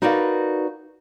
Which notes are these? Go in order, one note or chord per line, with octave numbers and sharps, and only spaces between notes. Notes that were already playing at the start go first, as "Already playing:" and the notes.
D#4 F#4 A#4 B4 D5 F5